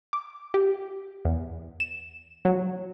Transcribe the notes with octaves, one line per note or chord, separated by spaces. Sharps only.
D6
G4
E2
E7
F#3